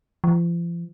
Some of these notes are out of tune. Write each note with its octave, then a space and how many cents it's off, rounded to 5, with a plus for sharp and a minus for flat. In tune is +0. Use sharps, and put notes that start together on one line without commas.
F3 -40